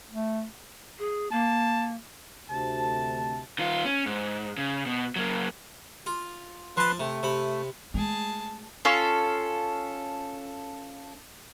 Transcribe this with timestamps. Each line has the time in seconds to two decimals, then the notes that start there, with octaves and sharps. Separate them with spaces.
0.11 A3
0.99 G#4
1.32 A#3 A5
2.49 D2 C3 A5
3.59 D#3 F4
3.85 C#4
4.06 G#2
4.58 C#3
4.86 B2
5.16 F#3 A#3
6.06 F4
6.77 F3 B4 A5 C6
7.00 C3 A3
7.23 C3 B5
7.94 G#3 A3 G#4 A5
8.85 C#4 F4 A4